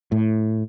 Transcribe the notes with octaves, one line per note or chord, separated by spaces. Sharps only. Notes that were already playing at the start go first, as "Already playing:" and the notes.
A2